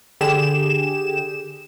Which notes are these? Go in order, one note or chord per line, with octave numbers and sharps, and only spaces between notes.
D3 G4 G#4 E7